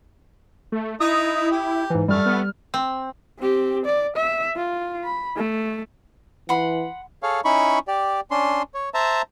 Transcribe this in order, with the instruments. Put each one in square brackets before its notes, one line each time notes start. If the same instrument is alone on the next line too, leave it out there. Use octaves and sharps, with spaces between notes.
[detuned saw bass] A3
[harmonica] D#4 [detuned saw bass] E4 [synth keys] D#6
[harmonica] G4
[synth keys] G#2 E3
[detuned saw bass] F#2 [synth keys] G3 F6 [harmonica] A3
[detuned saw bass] B3
[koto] C4
[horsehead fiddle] C4 G4
D5
E5
F4
B5
A3
[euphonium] E3 [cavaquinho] F#5 B5 C6
[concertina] G#4 A4 C#5 F5
C#4 D#4 E4 B5 C#6
G4 D5
C#4 D4 C6
C#5
C5 E5 A5 A#5